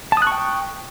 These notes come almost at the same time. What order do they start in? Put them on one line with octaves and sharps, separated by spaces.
A5 D#6 F#6 C#6 G5